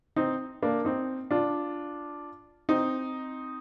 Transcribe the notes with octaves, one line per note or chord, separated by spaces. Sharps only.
C4 D#4
A#3 D4
C4 D#4
D4 F4
C4 D#4